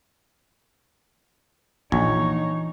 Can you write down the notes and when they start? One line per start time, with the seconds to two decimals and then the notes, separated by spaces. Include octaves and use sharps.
1.92 A#1 E3 D#4 C#5